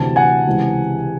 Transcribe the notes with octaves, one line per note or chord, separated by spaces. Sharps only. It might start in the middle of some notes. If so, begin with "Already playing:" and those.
Already playing: D2 C3 E3 A5
F#5 G#5
C#2 C3 E3